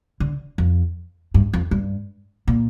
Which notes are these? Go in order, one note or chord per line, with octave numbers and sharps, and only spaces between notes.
D3
F2
G2
F2
G2
A#2